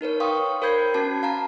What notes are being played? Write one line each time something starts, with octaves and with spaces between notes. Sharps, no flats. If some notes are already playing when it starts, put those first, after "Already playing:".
D#4 A#4 B4 C#5
F5 G5 C6 C#6 D#6
A#4 C5 B5 G6 G#6 C7
C#4 F#4 A5 C7
F5 A5 A#5